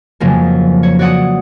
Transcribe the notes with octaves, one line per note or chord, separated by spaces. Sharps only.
F2 C#3 F3 F#3 G#3 A#3
C#5
F#4 C#5 D5 F#5 D#6